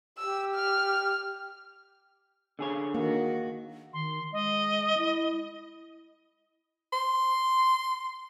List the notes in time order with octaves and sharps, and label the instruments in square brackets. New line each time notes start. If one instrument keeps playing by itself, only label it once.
[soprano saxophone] G4 [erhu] E6
[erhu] F6
[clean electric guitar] D3 G#4 C#5
[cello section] D#3 F#4 [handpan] A#3
[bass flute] D#3 [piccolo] C6
[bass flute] G#3 [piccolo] D#5
[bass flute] E4
[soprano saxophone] C6